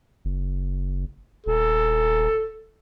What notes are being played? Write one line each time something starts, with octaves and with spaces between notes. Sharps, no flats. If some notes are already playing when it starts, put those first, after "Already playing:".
F#1
D#1 A4